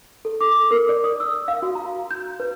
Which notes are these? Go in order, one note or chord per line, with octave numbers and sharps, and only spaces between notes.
A4
D6
A#4
D5
D#6
E6
F5
F#4
A#5
G6
B4